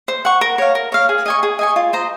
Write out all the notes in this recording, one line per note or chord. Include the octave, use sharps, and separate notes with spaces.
C5
F#5 C#6
A#4
C#5 F5
A#4
C#5 F5
G#4
D#5 G#5 C#6
G#4
D#5 G#5 C#6
F4
C5 D#5 A#5